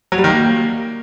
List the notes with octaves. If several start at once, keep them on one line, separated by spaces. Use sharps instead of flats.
F#3
G3
D#3
A#3